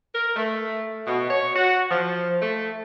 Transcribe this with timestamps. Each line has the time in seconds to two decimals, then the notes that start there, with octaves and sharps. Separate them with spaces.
0.14 A#4
0.36 A3
1.07 B2
1.30 C#5
1.56 F#4
1.91 F3
2.42 A3